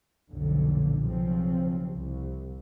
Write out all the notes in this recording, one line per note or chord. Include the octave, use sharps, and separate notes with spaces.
B1 F2 A#2 D3
B1 C#3 F3 C4
C2